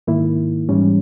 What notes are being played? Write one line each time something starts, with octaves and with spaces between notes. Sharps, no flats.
G#2 D#3 A#3 E4
G#2 E3 G3 C#4